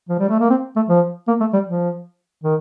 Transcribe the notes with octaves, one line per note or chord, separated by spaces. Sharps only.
F3
G3
A3
A#3
C4
A3
F3
A#3
A3
G3
F3
D#3